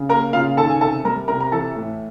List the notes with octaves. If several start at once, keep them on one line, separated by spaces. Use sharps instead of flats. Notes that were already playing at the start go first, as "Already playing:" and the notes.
Already playing: C#3
A#3 A#4 A#5
C#3 F4 F5
D#3 A4 A5
G#5
C3 A4 A5
G3 A#4 A#5
C3 A#4 A#5
A#5
E3 A4 A5
A2